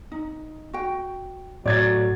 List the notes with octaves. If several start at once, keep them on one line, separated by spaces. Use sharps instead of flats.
D#4
F#4 G5
A2 F#3 C#5 D5 G#6 A6